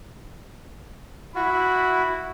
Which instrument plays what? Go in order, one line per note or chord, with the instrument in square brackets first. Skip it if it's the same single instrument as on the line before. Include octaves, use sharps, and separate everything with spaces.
[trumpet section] E4 [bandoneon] F#4 [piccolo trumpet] B5